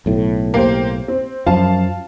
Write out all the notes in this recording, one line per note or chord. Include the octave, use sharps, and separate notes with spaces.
B1 A2
A#3 G4 C5
C4
F#2 F3 F5 A5